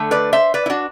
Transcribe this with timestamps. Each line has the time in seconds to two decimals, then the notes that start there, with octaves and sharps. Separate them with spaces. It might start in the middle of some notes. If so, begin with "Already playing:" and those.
Already playing: D3 A3
0.11 B4 D5
0.33 C5 E5
0.54 B4 D5
0.66 E4
0.70 D4 F#4